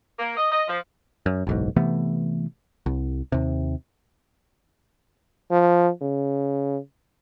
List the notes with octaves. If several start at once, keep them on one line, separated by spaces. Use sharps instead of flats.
A#3
D#5
D#5
F3
F#2
F#1 B1 G#2
C3 E3 A3 B3
C2
D#2 C3
F3
C#3